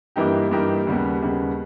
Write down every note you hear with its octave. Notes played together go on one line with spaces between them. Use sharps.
G2 E3 A#3 D#4 G4
G2 E3 A#3 D#4 G4
D#2 C#3 G3 B3
D#2 C#3 G3 B3